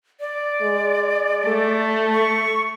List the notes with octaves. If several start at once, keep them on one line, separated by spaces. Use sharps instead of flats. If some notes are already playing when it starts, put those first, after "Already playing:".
D5
G#3
A3 A4
C#6